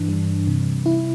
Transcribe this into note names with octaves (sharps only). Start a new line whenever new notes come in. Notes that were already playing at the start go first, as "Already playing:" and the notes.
Already playing: G2 E3 D4
G3
C3
E4